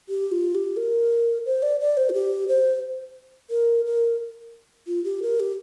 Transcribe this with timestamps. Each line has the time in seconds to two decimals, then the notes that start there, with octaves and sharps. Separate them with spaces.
0.09 G4
0.31 F4
0.55 G4
0.77 A#4
1.46 C5
1.62 D5
1.80 D5
1.97 C5
2.09 F4
2.13 G4
2.48 C5
3.50 A#4
3.86 A#4
4.87 F4
5.04 G4
5.22 A#4
5.40 G4